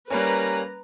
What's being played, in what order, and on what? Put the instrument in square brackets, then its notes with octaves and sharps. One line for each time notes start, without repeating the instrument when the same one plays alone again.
[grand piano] G3 A#3 C#4 [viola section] B4 A#5